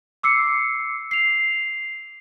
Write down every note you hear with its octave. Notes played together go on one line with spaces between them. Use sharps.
D6 E6 C7 C#7
C7 F7